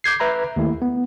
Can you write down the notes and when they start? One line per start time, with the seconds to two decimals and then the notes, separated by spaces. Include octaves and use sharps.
0.04 D6 G6 G#6 C7
0.20 B4 E5 A#5 B5
0.56 D#2 A3 E4
0.82 B3